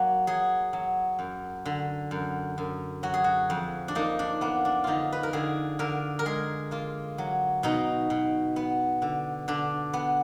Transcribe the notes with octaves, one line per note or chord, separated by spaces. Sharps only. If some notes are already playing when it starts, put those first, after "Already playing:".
Already playing: F#3 A#3
F#3 G#4
F#3
F#2
D3
F#2
F#2
F#3 F#4
G#4
F#4
F2
D4
A#3 D#4
D4
A#3 B3
D4
D3 D#4 F4
B4
A#4
D3 G#4
D3 A#4
A#4
G#3 G#4
A#3 F4
F#3
B2 D#4
B2
B3
D3
D3 D4
B3